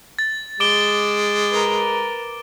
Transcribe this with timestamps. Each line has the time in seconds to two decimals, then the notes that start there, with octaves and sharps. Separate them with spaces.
0.19 A6
0.60 G#3 D6 D7 G7
1.50 A#4 B4